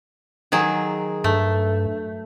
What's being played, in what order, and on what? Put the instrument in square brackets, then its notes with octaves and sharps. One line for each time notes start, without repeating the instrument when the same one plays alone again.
[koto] D#3 F#3 G#4
[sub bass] G2 [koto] A3